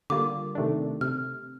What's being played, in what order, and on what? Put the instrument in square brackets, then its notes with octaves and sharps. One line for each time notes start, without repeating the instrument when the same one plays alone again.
[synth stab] D3 G3 A#3 F4 [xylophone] D6
[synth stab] C3 D#3 A3 D4
[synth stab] C3 [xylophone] F6